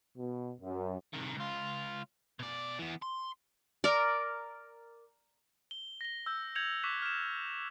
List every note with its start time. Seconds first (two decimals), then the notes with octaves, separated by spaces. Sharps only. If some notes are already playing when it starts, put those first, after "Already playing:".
0.17 B2
0.60 F#2
1.14 C2 D#3
1.36 C#2 F4
2.39 B2 D5
2.79 E3 B3
3.02 C6
3.84 A#4 D5
5.71 G7
6.01 A#6 G7
6.26 E6 G6
6.55 G6 G#6 C#7 F7 F#7
6.84 C#6 D6 F#6 B6 E7
7.02 F6 E7